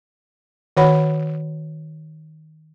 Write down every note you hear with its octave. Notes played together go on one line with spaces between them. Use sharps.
D#3 F#4 C#5 F#5 B5